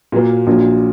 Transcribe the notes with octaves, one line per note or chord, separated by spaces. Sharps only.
A#2 F#3 A#3
A#1 A#2 F#3